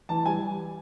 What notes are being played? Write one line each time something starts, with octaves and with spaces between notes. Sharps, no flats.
E3 A5
G3 G#5